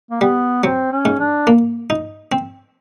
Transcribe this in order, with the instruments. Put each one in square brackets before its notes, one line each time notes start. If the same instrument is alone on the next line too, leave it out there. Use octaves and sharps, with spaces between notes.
[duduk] A#3
[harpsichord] G3 [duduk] B3
[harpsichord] F#3 [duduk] C4
[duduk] C#4
[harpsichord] G#2
[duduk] D4
[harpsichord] A#3
D#4
C4